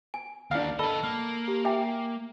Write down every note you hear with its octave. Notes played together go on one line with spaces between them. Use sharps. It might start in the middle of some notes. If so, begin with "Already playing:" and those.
G#5
D#2 D4 F5
A4 B4 D#5 B5 E6
A#3 F6
G4
G4 E5 G5 G#5